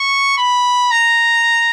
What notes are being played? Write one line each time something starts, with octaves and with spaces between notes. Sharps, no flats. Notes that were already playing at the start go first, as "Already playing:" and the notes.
Already playing: C#6
B5
A#5